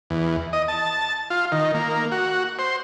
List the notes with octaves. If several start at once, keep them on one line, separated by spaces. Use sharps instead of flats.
E2
D#5
A5
F4
D#3
A#3
F#4
C5